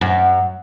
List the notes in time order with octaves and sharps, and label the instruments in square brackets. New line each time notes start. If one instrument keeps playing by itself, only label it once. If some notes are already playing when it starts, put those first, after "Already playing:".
[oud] F#2